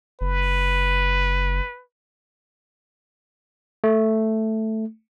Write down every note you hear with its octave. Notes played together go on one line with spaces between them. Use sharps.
F#1 B4
A3